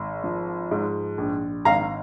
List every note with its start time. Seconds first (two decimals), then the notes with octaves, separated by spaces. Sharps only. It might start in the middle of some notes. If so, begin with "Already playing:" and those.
Already playing: G#1
0.24 F3
0.71 G#2
1.18 A#1
1.65 G#1 F5 A#5